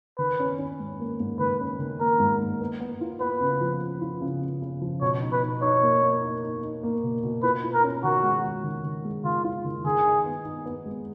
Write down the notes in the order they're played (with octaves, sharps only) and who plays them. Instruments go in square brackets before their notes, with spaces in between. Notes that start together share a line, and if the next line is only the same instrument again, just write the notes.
[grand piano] D#3 [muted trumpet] B4
[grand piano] C#4
C#4
G#2
A#3
G#2
[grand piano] D#3 [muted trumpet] B4
[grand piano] C#4
D#3
[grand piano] A#3 [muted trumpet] A#4
[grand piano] G#2
A#3
B3
B3
F4
[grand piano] B3 [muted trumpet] B4
[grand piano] C#3
F3
F3
F4
C#3
C#3
C#3
F3
[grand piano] B2 [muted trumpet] C#5
[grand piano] D#4
[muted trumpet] B4
[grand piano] D#4
[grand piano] D#4 [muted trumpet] C#5
[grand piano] A#3
A#3
D#4
D#4
D#4
A#3
B2
B2
[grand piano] F4 [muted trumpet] B4
[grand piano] F4
[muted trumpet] A#4
[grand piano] C#4
[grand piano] D#3 [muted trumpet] F#4
[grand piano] G#3
G#3
D#3
D#3
G#3
[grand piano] D#3 [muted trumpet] F4
[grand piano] F4
D#3
[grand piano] D#3 [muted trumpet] G#4
[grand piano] D#4
B3
D#4
B3
G#3